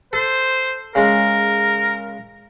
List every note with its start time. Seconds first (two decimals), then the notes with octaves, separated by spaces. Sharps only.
0.13 A4 C5
0.95 C#3 G#3 A#4